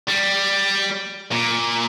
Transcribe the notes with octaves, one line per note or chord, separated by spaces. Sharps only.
G3
A#2